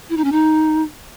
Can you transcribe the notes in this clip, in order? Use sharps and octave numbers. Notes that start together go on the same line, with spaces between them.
E4
D#4
C#4
D#4